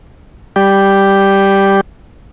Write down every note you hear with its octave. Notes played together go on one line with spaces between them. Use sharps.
G3 G4